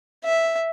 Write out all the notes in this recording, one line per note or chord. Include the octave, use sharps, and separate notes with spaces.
E5